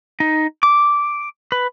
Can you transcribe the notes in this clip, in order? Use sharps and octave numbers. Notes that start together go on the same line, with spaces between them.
D#4
D6
B4